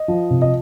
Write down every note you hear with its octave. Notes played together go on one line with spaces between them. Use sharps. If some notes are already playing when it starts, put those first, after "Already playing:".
Already playing: D#5
F3
C3
D#5